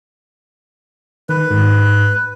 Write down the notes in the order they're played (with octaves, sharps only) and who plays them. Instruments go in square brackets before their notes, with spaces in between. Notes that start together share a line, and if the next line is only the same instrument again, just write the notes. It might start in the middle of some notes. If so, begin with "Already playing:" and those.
[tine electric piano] D#3 [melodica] B4
[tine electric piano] G#2